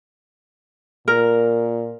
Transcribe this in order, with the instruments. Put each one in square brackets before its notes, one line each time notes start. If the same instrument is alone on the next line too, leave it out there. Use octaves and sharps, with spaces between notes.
[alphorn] A#2 [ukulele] A#4